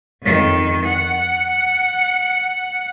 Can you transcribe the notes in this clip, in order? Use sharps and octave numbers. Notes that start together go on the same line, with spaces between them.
F2 D#3
F#5